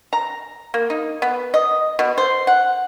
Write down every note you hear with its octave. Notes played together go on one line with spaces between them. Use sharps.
A#5
A#3
D#4
B3
D#5
B2
C5
F#5